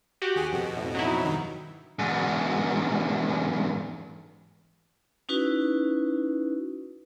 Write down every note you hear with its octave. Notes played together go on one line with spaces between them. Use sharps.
F#4 G4
D#2 G#4
F2 B2
A1
F#3 D#4 E4
G2 D#3
E2 G#2
C#4 D#4 E4 F#4 B4